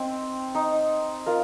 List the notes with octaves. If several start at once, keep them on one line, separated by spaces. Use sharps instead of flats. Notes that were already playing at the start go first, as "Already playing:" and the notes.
Already playing: C4 D#4
D#4
F4 A#4